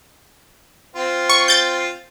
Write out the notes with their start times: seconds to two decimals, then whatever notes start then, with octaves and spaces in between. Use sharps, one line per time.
0.96 C4 F4
1.30 C#6
1.48 G6 A6